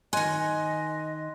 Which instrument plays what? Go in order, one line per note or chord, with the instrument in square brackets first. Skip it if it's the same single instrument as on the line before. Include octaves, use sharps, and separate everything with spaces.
[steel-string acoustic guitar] D#3 G#5 [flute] D#5 [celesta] C6 F#6